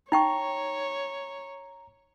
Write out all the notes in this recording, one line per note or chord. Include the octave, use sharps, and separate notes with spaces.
D#4 C#5 G5 A#5 C#6